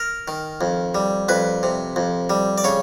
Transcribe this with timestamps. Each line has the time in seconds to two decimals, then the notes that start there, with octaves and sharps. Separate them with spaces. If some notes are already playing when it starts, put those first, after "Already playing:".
Already playing: A#4
0.28 D#3
0.61 F2
0.95 G3
1.29 F2 B4
1.63 C3
1.96 F2
2.30 G3
2.58 D5
2.64 C#3 C#5